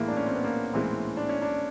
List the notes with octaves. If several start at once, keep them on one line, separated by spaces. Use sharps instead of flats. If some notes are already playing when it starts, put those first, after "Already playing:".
Already playing: A2 E3 G#3 A#3
D4
C#4
C4
B3
A#3
A2 E3 G#3 C4
D4
C#4
D4